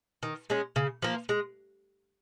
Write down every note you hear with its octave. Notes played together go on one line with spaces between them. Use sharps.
D#3
G#3 C#4
C#3
F3 A#3
G#3